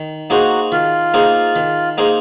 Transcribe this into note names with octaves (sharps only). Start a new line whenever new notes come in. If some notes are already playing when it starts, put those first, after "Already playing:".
Already playing: D#3
A#3 D#4 F#4 G#4 C5
D#3 F4
A#3 D#4 G#4 C5
D#3
A#3 D#4 G#4 C5